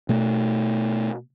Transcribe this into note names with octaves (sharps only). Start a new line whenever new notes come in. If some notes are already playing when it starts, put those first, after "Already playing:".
B2 A3